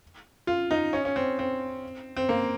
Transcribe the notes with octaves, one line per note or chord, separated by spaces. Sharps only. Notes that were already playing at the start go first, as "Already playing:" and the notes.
F4
D#4
C#4
C#4
C4
C4
C4
A#3